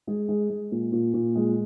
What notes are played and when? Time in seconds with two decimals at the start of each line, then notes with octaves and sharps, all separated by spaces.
0.07 G#3 G#4
0.29 G#3
0.49 G#3
0.72 A#2
0.92 A#2
1.14 A#2
1.35 G#3